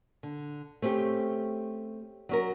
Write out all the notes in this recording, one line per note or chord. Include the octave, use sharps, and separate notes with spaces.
D3
A3 C4 C#4 G4
F#3 C#4 A#4